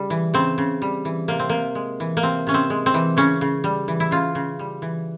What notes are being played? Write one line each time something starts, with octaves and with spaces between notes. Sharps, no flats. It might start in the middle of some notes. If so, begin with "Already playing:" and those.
Already playing: C#3 G3
E3
C#3 C4
C#3
G3
E3
C3 A#3
C4
C3 A#3
G#3
E3
A#3
C3 C4
C3 C#4
C4
G#3
C4
E3
C#3 C#4
C#3
G3
E3
E4
C#3 F4
C#3
G3
E3